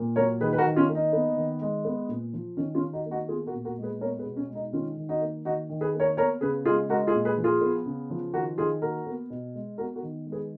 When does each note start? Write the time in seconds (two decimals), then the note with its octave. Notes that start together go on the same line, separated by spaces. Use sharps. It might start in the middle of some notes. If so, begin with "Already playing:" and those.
Already playing: A#2 A#3
0.16 F#3 A#4 C#5
0.41 D#3 G#4 B4
0.53 B4
0.58 F#4 A#4
0.65 D#3
0.76 C#4 F4
0.88 A#3
0.95 D#4
1.13 B3
1.37 D#3
1.61 G#3
1.85 B3
2.09 A#2
2.33 F3
2.57 D#3 C#4
2.75 C#4 F4
2.80 D#3
2.93 D#4 F#4
3.05 A#3
3.11 D#4 F#4
3.28 B3 F4 G#4
3.46 F#4 A#4
3.53 A#2
3.65 F#4 A#4
3.77 G#3
3.82 G#4 B4
4.01 B3 A#4 C#5
4.19 G#4 B4
4.25 B2
4.37 C#4
4.49 G#3
4.55 D#4
4.73 D#3 C#4 F4
4.97 D#3
5.09 D#4 F#4
5.21 A#3
5.45 D#3 D#4 F#4
5.69 D#3
5.81 G#4 B4
5.94 A#3
6.00 A#4 C#5
6.17 B3 A#4 C#5
6.41 C#3 G#4 B4
6.65 G#3 F4 G#4
6.89 G#3 F#4 A#4
7.07 F4 G#4
7.13 A#2
7.25 G#4 B4
7.38 F3
7.44 F4 G#4
7.61 B3
7.86 C#3
8.10 F3
8.34 D#3 F#4 A#4
8.57 D#3 F4 G#4
8.82 A#3 F#4 A#4
9.07 B3
9.30 B2
9.55 G#3
9.78 B3 F#4 A#4
9.96 F#4 A#4
10.02 D#3
10.26 G#3
10.32 G#4 B4